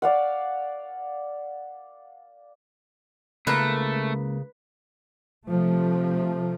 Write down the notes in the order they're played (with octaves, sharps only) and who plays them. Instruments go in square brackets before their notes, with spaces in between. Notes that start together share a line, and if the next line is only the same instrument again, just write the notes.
[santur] D5 F5 F#5
[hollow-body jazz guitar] C#2 A#3 A#4 [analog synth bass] C#3 [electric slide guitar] A3 [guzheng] B4
[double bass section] C3 F3 A3